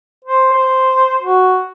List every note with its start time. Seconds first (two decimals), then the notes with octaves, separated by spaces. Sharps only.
0.24 C5
0.52 C5
1.22 F#4